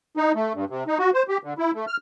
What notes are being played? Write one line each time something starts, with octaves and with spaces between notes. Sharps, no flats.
D#4
A3
G2
C3
D#4
F#4
C5
G4
D3
E4
A3
F6